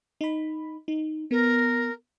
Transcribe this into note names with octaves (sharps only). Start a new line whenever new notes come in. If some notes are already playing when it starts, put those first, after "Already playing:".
D#4 B5
D#4
B3 A#4